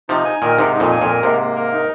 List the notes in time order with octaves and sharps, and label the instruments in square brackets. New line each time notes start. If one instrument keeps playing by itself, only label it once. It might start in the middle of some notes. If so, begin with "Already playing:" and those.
[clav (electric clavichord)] C3 F3 [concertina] D#4
[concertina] G#5
[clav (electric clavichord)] A#2 D#3 [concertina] A#4
[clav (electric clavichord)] G#2 C3 [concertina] D#4
[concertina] D#4
[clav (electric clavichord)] F2 A#2
[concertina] G#5
[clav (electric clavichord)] F2 A#2
[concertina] A#4
[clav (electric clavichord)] G#2 C3 [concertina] A#3
[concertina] A#3
A#4
D#4